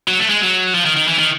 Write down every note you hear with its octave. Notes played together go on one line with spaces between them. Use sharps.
F#3
A3
G#3
F#3
F3
D#3
D#3
E3
D#3